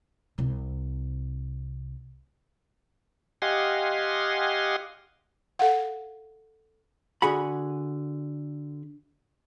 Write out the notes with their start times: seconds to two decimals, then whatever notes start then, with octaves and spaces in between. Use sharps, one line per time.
0.38 C2 C3
3.42 G4 D#5 F5 F#5 G#5 C6
5.59 A4 F5 F#5
7.22 D3 F#4 G#4 F#5 B5